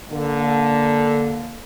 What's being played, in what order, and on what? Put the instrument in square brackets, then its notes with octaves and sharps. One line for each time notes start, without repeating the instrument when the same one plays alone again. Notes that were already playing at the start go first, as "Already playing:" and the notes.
[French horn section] D3 A#3